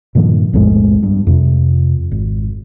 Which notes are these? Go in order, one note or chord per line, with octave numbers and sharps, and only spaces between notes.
G2 A#2 D#3 F3
B1 F2 A2 G#3
G2
F2 C3
G#1